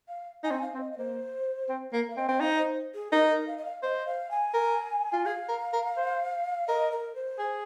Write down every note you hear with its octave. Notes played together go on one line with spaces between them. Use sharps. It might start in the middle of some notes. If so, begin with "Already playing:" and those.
F5
D#4 G#5
C4
F5
C4 C5
D#5
D#5
A#3 C5
C4
A#3 A#4
F5
C4 D#5
C4
D#4 F5
D#5
C5
G#4
D#4 A#4
A#4
F5
D#5
F5
C5 D#5
F5
G#5
A#4
F4
G#4 F5
A#4
A#4
C5
A#4 D#5
A#4
C5
G#4